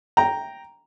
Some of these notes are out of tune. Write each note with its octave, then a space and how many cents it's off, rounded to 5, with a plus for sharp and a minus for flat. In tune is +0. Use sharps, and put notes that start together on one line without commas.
G5 +0 A#5 +0